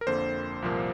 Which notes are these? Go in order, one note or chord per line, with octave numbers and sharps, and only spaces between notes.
A#4
F2 D3 A#3 C5
C2 A#2 F3 A#3